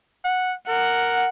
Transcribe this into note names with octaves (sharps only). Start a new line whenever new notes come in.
F#5
A#4 F#5